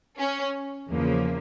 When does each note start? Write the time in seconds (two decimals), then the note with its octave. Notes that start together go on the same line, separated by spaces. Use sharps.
0.19 C#4
0.90 E2 C#3 F3 A#3